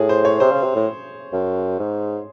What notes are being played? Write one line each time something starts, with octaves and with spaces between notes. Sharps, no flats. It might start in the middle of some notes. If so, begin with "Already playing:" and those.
Already playing: A2 G#4
C5
C#5
C3 C5
C#3
C3
A2
F#2
G#2